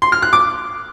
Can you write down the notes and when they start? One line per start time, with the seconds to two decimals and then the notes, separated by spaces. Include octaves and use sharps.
0.02 C6
0.12 F6
0.22 F#6
0.33 D6